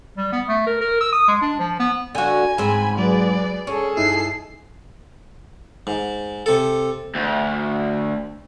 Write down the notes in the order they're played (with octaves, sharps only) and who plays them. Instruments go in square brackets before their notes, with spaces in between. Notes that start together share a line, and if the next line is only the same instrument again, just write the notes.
[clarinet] G3
B3
A3
A#4
A#4
E6
D#6
G#3
D4
F3
B3
[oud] D3 F#4 [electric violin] G#5
[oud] G#2 C4 [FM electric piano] G#4 [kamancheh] B5
[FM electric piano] F#3 [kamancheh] G#4 B4 [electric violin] D5
[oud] C#4 [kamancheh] G#4 A4
[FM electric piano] G2 D#4 E4 [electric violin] C7
[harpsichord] G#2
C3 A4
[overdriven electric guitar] D2